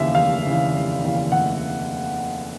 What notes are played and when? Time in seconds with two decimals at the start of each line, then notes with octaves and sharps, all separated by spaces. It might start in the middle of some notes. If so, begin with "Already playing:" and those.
Already playing: F1 D#2 C#3 E3 E5 F5
0.15 F1 F5
0.45 D#2 C#3 E3
0.73 F1
1.03 D#2 C#3 E3
1.32 F1 F#5